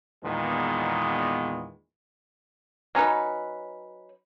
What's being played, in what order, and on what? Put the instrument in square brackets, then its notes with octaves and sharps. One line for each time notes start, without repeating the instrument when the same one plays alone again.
[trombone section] E2 A#2 D#3 G#3 B3
[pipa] F#3 C#4 D#4 B4